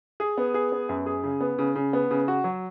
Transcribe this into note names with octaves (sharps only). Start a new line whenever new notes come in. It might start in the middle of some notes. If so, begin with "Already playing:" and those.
G#4
B3
G#4
B3
F#2
G#4
C#3
B3
C#3
C#3
B3
C#3
F#4
F#3